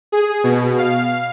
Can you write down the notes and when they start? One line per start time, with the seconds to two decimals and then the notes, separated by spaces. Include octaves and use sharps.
0.12 G#4
0.44 B2
0.78 F5